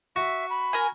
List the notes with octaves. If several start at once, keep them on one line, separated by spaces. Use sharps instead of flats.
F#4 E5
B5
A#4 G#5